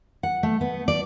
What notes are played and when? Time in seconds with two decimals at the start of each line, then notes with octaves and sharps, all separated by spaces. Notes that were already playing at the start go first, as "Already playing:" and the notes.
0.23 F#5
0.43 A3
0.61 B3
0.88 D5